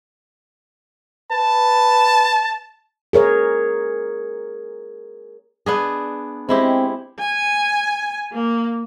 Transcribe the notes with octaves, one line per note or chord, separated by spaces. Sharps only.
B4 A5
G#4 A#4 C#5
B3 D4 G#4
G#3 C4 E4 G4
G#5
A#3